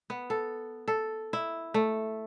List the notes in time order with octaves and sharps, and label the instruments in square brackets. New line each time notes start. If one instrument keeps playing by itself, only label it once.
[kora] B3
A4
A4
E4
A3